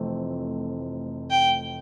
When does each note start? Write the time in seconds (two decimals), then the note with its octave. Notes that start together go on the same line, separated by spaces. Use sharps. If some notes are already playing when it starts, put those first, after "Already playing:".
Already playing: F1 F2 E3 A3 C4
1.31 G5